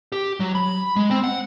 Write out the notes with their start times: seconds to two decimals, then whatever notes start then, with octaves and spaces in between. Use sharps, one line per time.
0.12 G4
0.40 F#3
0.55 B5
0.96 G#3
1.11 C4
1.24 F#5